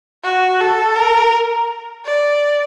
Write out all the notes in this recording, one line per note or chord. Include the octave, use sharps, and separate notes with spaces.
F#4
A4
A#4
D5